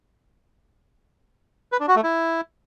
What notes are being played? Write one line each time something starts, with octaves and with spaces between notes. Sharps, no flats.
B4
D4
F#4
A3
E4